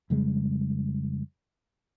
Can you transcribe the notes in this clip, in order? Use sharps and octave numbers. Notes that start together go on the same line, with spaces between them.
F2 C#3 G3 G#3